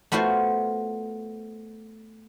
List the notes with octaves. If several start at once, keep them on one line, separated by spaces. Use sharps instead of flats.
A3 B3 F4 F#4 C5